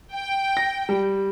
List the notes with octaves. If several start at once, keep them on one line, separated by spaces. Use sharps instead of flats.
G5
A#6
G3